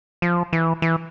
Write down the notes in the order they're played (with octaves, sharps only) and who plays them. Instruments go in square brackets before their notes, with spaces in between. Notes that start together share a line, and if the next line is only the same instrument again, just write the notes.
[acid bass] F3
E3
E3